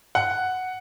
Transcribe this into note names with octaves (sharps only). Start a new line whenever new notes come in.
F#5